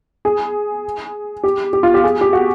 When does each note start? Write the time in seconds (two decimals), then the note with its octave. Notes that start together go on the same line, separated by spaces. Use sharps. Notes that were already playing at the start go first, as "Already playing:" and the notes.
0.25 G#4
1.44 G4
1.73 G4
1.83 F4
1.94 G4
2.04 G#4
2.21 G4
2.33 F#4